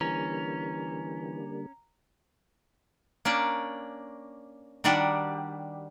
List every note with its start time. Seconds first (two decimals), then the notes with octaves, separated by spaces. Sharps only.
0.01 D3 E3 G3 A#3 C#4 A#5
3.25 A#3 C#4 D4 D5
4.84 D#3 G3 D4 F#4 G4